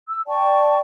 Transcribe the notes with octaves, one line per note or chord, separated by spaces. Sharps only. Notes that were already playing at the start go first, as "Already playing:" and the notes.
E6
D5 G5 A5 C#6